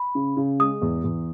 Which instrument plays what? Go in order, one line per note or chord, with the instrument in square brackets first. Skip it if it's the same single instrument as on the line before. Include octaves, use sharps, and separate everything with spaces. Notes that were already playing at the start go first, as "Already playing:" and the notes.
Already playing: [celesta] B5
[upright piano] C#3
C#3
[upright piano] G#3 [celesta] D#6
[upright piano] E2
E2